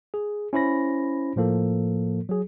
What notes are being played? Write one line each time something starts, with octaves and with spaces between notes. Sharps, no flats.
G#4
C#4 E4 C5 B5 A#6
A2 F3 A#3 A4
F#3 G#4